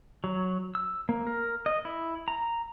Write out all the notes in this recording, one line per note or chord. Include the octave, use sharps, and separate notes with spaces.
F#3
E6
A#3
A#4
D#5
E4
A#5